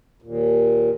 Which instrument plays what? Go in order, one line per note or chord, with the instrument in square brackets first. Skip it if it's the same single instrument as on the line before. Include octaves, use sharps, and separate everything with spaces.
[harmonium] D#2 A#2